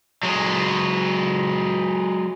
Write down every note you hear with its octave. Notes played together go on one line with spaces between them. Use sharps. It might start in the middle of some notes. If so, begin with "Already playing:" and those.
F#3 G#3